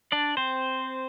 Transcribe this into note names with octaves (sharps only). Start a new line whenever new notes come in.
D4 D5
C4 C5